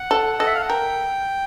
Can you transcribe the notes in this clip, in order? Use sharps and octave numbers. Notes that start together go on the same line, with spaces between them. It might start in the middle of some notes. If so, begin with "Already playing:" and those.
Already playing: F#5
A4
A4 D#5
E5
F5
F#5
A#4 G5